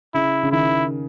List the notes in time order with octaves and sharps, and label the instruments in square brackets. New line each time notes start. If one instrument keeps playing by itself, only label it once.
[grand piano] C#3 [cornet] E4
[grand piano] C#3
[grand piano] D#3 [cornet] E4